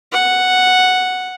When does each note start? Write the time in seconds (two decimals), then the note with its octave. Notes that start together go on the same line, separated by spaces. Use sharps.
0.12 F#5